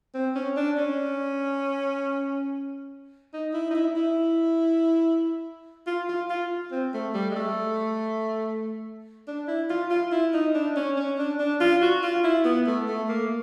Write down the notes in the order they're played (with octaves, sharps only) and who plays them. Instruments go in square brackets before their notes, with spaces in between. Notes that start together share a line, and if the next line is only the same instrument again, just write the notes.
[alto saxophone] C4
C#4
D4
C#4
D#4
E4
D#4
E4
E4
F4
F4
F4
C4
A3
G3
G#3
A3
D4
E4
F4
F4
E4
D#4
D4
C#4
C#4
D4
D4
F4
F#4
F4
E4
B3
A3
A3
A#3